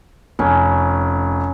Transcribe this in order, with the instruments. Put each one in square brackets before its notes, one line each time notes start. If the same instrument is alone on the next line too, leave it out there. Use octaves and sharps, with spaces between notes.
[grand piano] F1 [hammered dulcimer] C#4